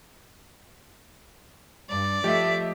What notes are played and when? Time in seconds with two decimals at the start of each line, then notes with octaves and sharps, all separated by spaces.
1.90 G2 D5
2.24 F3 A3 G4 D#5 E5